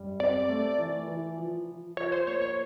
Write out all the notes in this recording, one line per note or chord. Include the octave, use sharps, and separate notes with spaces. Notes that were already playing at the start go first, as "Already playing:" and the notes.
Already playing: F#2 G3
C4 D5
A3
E3
E3
F3
F3
F3 C#5
C5
A#3 C#5
C#5